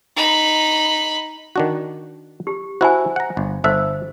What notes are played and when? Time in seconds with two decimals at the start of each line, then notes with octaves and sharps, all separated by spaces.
0.17 D#4 B5
1.56 D#3 D4 F#4
2.47 G4
2.81 E4 F#4 C5 G#5
3.16 F#5 A#5
3.37 G1
3.64 G1 A4 C5 E5